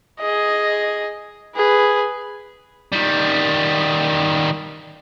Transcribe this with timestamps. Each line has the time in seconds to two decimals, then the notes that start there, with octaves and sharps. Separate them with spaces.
0.21 G#4 D#5
1.56 G#4 B4
2.92 D#3 G3